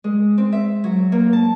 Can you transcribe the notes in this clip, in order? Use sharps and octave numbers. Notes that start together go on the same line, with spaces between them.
G#3
C4
E5
F#3
A#3
A5